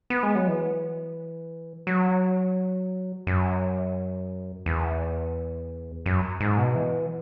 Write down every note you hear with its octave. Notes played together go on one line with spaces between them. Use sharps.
B3
G#3
F#3
E3
F#3
F#2
E2
F#2
G#2
B2
E3